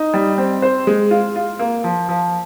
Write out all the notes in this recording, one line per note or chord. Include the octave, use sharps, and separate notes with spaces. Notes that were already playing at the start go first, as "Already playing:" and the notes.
Already playing: D#4
G3
C4
C5
G#3
F4
F4
A#3
F3
F3